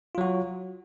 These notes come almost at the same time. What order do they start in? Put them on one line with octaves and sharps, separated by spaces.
F4 F#3 F#4